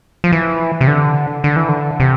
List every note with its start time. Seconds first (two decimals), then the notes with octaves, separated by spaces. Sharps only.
0.24 F3
0.32 E3
0.81 C3
0.87 D3
1.44 D3
1.56 E3
1.69 D3
2.00 C3